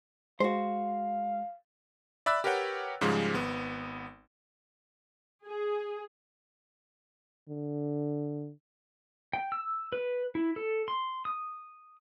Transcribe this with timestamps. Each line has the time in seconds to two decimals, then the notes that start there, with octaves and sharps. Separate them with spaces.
0.40 G#3 F#4 C5 F5
2.26 D5 E5 B5 E6 F#6 A6
2.44 G4 A#4 B4 C#5 F#5 G5
3.01 G#2 C#3 F3 G3 G#3
3.34 G#1 B3
5.45 G#4
7.49 D3
9.33 G5
9.52 E6
9.92 B4
10.35 E4
10.56 A4
10.88 C6
11.25 D#6